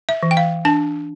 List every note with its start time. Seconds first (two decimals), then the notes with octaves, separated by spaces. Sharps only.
0.09 E5
0.23 E3
0.31 G5
0.37 F5
0.65 D4 A5